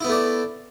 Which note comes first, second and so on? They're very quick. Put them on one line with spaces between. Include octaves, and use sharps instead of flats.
E4 B3 A3 D5